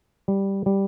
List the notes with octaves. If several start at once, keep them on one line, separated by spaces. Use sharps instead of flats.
G3
G3